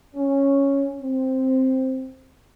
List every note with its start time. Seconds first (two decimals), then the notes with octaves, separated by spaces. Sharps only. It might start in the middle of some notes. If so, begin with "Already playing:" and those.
0.16 C#4
0.99 C4